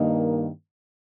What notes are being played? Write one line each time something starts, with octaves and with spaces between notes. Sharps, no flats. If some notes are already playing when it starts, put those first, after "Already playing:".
Already playing: G2 D#3 A#3 D#4